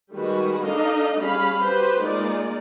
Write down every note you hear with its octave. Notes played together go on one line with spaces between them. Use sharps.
D#3 G3 G#3 F#4 B4
D4 D#4 A4 D#5 F5
G3 C#4 G#4 F5 B5
F#4 G4 B4 C5
G#3 A#3 D#4 F4 D5